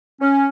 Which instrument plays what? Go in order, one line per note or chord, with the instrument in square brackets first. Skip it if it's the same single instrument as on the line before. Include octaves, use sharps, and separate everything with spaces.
[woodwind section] C#4